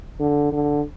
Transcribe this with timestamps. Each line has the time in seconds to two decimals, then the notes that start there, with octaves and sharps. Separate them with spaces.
0.19 D3
0.52 D3